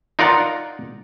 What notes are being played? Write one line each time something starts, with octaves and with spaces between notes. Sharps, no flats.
D#4 F4 A#4 D5 F#5